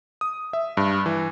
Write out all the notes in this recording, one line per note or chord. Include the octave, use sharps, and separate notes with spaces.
D#6
E5
G2
E3